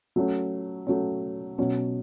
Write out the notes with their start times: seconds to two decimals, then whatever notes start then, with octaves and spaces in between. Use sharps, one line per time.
0.16 F#3 A3 C#4
0.87 F#3 A3 C#4
1.58 B2 F#3 C#4